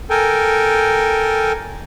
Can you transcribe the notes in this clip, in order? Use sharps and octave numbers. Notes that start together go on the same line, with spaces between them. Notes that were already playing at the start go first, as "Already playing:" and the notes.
A4 A#4 G5 G#5